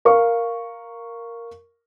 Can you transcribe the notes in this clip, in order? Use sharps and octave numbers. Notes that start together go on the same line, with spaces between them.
A#4 F5 C#6